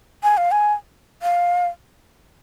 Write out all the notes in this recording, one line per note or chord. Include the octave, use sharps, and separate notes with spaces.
G#5
F5
G#5
F5